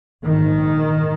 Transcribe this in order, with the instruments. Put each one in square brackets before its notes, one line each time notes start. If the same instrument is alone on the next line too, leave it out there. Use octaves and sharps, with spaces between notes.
[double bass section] A#1 G#2 D#3